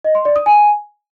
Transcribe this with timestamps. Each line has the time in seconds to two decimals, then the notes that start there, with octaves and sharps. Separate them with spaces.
0.04 D#5
0.15 C6
0.25 D5
0.36 D#6
0.46 G#5